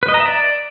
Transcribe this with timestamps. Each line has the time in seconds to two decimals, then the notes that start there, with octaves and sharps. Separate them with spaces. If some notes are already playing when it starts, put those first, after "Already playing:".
0.03 B4
0.08 D#5
0.14 A#5
0.20 E5
0.26 D5